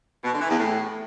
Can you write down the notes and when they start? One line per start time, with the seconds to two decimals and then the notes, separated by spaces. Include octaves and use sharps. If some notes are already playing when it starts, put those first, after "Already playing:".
0.24 B2
0.33 D3
0.41 E3
0.50 E2
0.58 A2